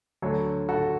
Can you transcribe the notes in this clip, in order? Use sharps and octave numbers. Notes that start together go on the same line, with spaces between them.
D2 D3 F#3 A4 C#5
F#4 A4